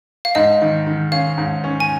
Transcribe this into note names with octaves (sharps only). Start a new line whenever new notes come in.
F5
G#2 D#5
D#3
D#3
C#4 F5
G#2
C#4
G#5